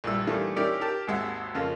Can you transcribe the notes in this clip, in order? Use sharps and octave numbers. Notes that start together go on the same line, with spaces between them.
A#1 G2 E4 E6
D#3 E3 G3 A3 A#3 D4
C#4 D#4 E4 G4 A#4 D5
G4 A#4 A5
G#1 D#2 G#3 E5 F#5
F2 C#3 A#3 F4